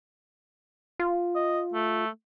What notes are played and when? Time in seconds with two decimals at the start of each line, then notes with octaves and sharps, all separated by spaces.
0.99 F4
1.36 D#5
1.74 A3